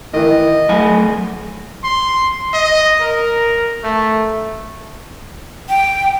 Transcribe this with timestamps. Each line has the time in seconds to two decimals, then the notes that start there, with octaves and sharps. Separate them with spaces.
0.14 D#3 E3 D#5
0.69 F#3 A3 F#5 G#5 B5
1.84 C6
2.53 D#5
3.00 A#4
3.84 A3
5.69 G5